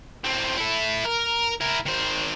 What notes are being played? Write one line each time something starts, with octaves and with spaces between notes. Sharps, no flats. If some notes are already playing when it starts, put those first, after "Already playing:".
A2 C4
E4 A4
A#4
E4 A#4
D#3 C5